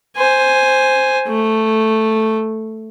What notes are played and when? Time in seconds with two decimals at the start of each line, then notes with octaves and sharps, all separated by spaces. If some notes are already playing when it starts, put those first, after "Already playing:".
0.16 C5 G#5
1.28 A3